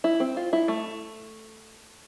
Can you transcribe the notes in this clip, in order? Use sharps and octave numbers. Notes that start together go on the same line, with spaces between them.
E4
C4
F4
E4
A3